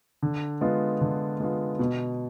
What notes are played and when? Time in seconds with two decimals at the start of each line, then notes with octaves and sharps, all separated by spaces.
0.23 D3
0.61 G#3 B3 F4
1.01 D3
1.40 G#3 B3 F4
1.79 B2